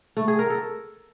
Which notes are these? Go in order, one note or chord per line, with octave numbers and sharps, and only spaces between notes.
A3
G#4
A#4
A4